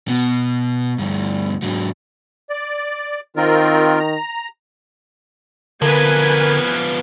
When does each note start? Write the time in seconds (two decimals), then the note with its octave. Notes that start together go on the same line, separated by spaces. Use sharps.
0.08 B2
0.98 D2 G2
1.62 G#2 F#3
2.50 D5
3.36 D#3 C4 F4 A#4
4.00 A#5
5.82 D3 F3 B3 A#4 B4 G#5